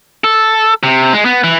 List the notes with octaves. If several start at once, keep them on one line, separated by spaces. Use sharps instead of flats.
A4
C3
G#3
B3
E3